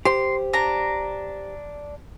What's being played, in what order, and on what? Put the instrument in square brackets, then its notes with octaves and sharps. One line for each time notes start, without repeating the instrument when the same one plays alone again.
[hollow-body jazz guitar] G4 C5 [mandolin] C6
[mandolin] D4 A#5